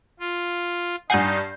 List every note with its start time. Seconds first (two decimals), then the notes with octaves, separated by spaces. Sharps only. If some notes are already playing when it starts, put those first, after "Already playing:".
0.20 F4
1.10 G2 D#4 F#5 G#5 G6 C7